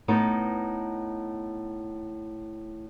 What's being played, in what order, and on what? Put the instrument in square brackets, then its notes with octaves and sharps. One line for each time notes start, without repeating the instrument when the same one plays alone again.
[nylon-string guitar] A2 B3 D#4